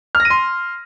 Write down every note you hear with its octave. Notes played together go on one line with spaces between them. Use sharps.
F6
A#6
D#7
C6